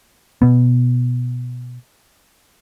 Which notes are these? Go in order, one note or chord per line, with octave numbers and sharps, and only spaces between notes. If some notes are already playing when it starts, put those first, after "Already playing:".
B2 B3